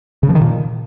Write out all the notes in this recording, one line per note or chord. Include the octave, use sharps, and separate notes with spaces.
C#3
F3
D#3
A#2